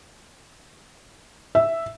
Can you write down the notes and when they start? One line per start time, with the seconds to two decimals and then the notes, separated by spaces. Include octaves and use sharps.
1.55 E5